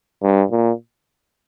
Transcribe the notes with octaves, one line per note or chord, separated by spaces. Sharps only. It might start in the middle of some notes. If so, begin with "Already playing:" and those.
G2
A#2